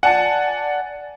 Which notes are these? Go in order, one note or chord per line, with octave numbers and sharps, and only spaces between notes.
D5 F#5 G#5 A5 C#7